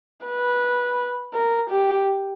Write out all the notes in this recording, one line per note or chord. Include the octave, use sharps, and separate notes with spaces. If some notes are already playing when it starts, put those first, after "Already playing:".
B4
A#4
G4